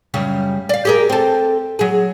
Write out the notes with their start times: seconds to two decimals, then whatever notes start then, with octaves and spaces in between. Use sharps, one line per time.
0.14 F#2 C#3 G3
0.69 D5 F5
0.85 G4 G#4 A#4
1.09 C4 A4
1.79 F#3 G#4